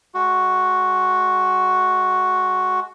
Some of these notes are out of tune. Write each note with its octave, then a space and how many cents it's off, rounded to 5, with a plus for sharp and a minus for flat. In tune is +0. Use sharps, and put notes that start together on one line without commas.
G#3 +30 F#4 +0